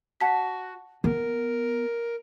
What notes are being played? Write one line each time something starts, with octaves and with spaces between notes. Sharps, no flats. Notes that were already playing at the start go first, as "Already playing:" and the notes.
F#4 F#5 A5 B6
B3 A#4